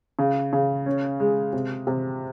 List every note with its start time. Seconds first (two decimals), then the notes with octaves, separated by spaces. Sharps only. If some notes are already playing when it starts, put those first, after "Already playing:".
0.19 C#3
0.53 C#3
0.86 C#4
1.20 G#3
1.53 C3
1.87 C3